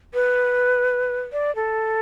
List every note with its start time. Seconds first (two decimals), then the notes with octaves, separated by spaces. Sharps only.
0.14 B4
1.32 D5
1.56 A4